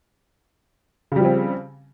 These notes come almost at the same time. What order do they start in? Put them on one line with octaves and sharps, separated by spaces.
C#3 G3 F3 C4